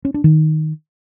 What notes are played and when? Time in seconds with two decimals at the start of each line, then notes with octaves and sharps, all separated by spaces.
0.05 C#4
0.14 D4
0.24 D#3